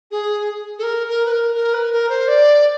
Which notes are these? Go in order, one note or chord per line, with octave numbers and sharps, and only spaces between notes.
G#4
A4
A#4
A#4
B4
A#4
A#4
B4
A#4
C5
D5